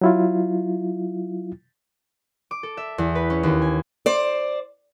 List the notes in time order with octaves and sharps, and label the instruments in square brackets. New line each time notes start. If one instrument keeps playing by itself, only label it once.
[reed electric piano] F#3 E4 F4
[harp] D6
A4
E5
E2
B4
C#4
D#2
G#5
[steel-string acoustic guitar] C5 D5